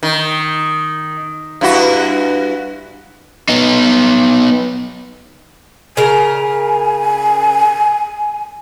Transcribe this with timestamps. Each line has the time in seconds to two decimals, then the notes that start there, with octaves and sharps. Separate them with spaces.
0.03 D#3
1.61 G2 E4 F#4
3.49 B3 D#4
5.97 C#3 A#4 G#5